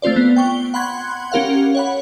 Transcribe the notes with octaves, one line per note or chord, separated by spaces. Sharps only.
A3 C4 F4 C5 D5
B3
G5 C#6 G7
F#5 B5 C6 F#6 G#6
C#4 G4 A#4 F5 F#5
C#5 F#5 B5